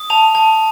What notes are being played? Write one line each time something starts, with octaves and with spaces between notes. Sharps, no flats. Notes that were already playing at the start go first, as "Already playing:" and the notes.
Already playing: D#6
A5 F7
A5